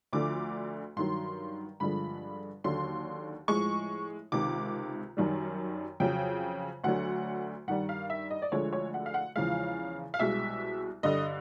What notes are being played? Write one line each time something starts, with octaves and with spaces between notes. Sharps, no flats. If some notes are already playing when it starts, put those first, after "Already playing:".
D2 D3 F3 D6
G2 D#3 F#3 C6
G2 D3 F3 G#3 B5
D#2 D3 F#3 C6
A2 F3 G#3 C#6
C#2 C3 D#3 D6
F#2 D#3 G3
F2 C#3 F#3 G5
D2 D3 F#3 F#5
G2 D#3 G3 F#5
F5
E5
D#5
D5
D2 D3 F3 G#3 C#5
C#5
F#5
F5
F#5
E2 C#3 F3 G#3 F5
F5
C2 B2 G#3 E5
G2 D3 G3 D#5